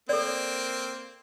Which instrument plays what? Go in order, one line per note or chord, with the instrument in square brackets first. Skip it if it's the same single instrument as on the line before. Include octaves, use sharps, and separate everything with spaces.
[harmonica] A#3 C4 [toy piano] A4 D5